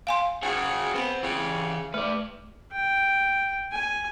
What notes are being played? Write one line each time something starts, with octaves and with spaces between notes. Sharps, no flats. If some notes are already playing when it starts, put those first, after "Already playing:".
F5 G#5 C6
C#3 F#4 G#4
B3 C4
C#3 E3 G4
A3 B4 D5
G5
G#5